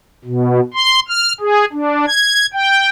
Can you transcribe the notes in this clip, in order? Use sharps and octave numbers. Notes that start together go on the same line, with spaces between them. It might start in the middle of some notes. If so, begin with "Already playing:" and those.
B2
C6
F6
G#4
D4
G#6
G5